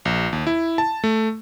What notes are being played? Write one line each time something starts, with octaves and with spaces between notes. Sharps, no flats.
A#1
D#2
E4
A5
A3